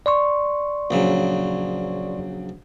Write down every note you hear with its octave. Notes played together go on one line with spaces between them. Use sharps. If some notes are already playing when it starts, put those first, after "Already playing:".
D5 C6 C#6
A#1 C#3 F#3